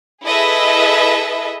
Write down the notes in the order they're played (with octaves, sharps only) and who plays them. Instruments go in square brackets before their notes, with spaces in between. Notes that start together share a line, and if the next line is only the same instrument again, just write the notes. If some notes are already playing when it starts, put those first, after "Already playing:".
[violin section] E4 G#4 A4 B4 D#5 E5